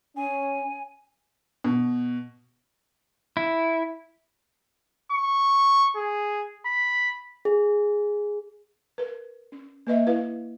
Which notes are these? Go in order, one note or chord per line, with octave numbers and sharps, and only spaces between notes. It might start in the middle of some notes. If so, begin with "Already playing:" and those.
C#4 G#5
B2
E4
C#6
G#4
B5
G#4
A#4 B4
C#4
A#3 B4 D#5 E5
E4 B4 F5